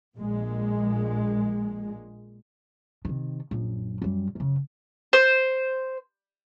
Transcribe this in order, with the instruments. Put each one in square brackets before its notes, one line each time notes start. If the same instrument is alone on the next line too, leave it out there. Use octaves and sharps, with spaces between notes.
[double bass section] A#1 A#2 G#3
[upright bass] C3 D#3
A#1 F#2
F#2 G3
F#2 C#3
[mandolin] C5